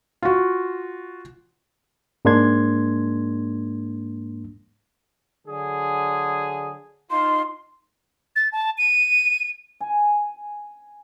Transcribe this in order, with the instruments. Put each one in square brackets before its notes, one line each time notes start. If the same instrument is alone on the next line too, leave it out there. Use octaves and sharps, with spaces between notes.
[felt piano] F4 F#4
[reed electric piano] G#2 G#3 A#3 D4 C6 G#6
[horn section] D3 F#3 G#4
[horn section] D#4 F4 [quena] C6
[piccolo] A6
A5
D#7
[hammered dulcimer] G#5